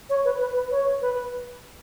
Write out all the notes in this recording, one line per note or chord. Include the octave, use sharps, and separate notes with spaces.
C#5
B4
B4
B4
C#5
B4